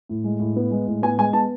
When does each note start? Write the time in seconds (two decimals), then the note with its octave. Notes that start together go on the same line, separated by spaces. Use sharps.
0.09 A2
0.24 G#3
0.40 A2
0.56 B3
0.71 G#3
0.86 A2
1.02 B3 G#5
1.18 G#3 G#5
1.33 B3 A5